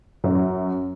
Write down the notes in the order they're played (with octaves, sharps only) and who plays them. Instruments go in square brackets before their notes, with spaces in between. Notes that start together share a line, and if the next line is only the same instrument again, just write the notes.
[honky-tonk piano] F#2